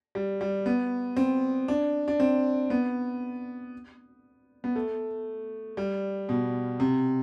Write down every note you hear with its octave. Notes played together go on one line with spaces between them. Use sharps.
G3
G3
B3
C4
D4
D4
C4
B3
B3
A3
G3
B2
C3